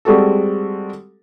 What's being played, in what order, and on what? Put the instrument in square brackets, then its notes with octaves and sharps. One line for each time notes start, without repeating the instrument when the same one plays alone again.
[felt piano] G3 G#3 C4 F#4 A4